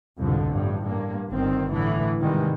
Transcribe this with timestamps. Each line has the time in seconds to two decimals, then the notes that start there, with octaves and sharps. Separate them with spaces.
0.18 C2 F2 G#2 B2 D3
0.49 A1 G2
0.85 G2 A#3
1.30 G1 D#3 C4
1.71 A2 D3 E3
2.20 G#2 C3 D#3 E3 G3 G#3